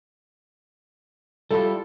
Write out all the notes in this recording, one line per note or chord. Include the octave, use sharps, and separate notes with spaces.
G3 E4 F4 A4